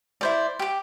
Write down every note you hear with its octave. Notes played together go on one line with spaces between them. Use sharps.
E4 C5 D5
G4 D6